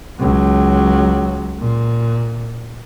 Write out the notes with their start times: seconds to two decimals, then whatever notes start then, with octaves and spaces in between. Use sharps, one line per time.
0.20 C#2 F#3
1.59 A#2